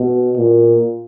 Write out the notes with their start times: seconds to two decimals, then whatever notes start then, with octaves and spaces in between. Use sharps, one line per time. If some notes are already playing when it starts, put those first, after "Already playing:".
Already playing: B2
0.37 A#2